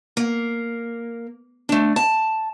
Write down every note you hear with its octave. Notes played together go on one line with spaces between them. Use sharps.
A#3
A3 D4
A5